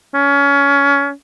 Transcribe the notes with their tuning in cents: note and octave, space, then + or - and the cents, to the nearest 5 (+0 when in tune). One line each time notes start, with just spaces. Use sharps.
C#4 +25